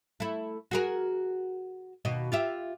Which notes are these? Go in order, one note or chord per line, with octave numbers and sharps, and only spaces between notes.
A3 E4
F#4 G#4 A#4
D#2 B2 D#5
F4 G4 E5